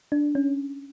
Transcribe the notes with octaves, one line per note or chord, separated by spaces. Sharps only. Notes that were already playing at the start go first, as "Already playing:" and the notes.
D4
C#4